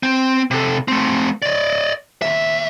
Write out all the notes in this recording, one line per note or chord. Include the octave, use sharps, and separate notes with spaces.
C4
C3 A4
A3 C4
D5 D#5
D#2 E5